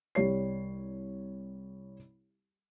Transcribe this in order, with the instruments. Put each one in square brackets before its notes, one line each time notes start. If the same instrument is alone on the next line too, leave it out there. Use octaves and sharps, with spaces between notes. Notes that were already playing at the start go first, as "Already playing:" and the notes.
[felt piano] C2 G3 C#5 C7